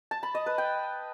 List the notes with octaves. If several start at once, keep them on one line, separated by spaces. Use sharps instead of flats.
A5
B5
D#5
B4
G5